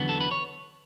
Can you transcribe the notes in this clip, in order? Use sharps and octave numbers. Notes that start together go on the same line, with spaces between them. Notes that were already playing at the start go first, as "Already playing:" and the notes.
Already playing: E2 D3 F#3 B3
A4
B4
C#5